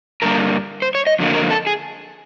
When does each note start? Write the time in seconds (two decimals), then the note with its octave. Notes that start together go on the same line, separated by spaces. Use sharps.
0.22 G2 D3 G3 A#3 A#4
0.82 C5
0.95 C#5
1.07 D#5
1.19 F2 D3 F#3 A#3
1.34 A#4
1.51 A4
1.67 G#4